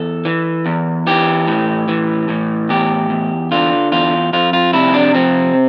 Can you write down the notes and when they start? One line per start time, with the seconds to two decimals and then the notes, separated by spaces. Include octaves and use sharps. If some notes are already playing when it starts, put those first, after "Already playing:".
Already playing: E2 A4
0.25 E3
0.66 E2
1.07 E3 G4
1.47 A2
1.88 E3
2.29 A2
2.69 E2 G4
3.10 E2
3.51 D3 F4
3.92 E2 F4
4.33 F2 F4
4.53 F4
4.73 C3 E4
4.94 D4
5.14 F2 C4